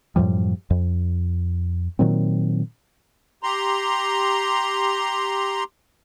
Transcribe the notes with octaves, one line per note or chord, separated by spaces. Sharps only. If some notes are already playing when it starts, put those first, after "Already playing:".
F#2 A2 F3 G3
F2
A#2 D#3 F#3 C4
G4 A#5 C6